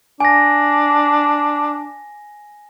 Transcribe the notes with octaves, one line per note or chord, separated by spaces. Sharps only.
D4 G#5 A#6